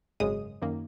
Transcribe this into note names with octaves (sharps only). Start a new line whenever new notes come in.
G#1 F#2 C#3 G#3 D#6
F#2 D#3 A#3